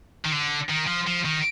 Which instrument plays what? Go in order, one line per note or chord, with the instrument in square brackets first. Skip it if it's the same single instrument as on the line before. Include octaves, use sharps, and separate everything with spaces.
[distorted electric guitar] D#3
D3
D#3
F3
F3
D#3